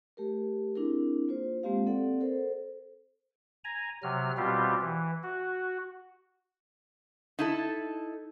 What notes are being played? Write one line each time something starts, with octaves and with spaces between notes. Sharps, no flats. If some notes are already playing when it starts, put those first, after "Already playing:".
A3 G4 A#4
C4 D4 E4 G#4 A#4
A#3 F4 C5
G#3 A#3 C4 F4 G4 F5
C4 A4 D5 F#5
A4 A#4 C5
G#5 A#5
C3 F#3 F6
B2 G3 C4 F4 G4
E3
F#4
D#4 E4 A4